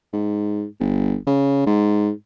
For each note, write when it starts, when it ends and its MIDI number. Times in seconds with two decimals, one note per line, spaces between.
0.13 0.64 44
0.80 1.15 31
1.27 1.65 49
1.66 2.10 44